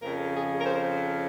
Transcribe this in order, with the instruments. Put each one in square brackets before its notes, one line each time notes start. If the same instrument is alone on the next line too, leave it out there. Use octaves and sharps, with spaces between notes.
[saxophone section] F2 C#3 F3 A#4
G#4
A#4
C5